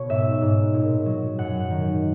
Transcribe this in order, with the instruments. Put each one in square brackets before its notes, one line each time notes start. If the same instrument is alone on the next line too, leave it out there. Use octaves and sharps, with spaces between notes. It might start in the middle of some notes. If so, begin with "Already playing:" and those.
Already playing: [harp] B2 C#5
G#2 E5
G#2
A#2
F#3
F#2 F#5
D#3